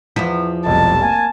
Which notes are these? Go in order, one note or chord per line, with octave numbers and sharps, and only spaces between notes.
E2 E3 F3 B6
F1 B1 G3 A5
A#3 G#5